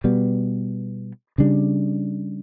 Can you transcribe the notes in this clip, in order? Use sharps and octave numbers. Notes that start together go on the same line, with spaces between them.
B2 G3 B3
C#3 G3 D4